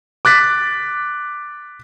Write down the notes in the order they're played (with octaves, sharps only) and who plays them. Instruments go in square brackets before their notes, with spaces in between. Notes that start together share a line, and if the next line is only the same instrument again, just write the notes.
[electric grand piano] D6 F#6 A6 B6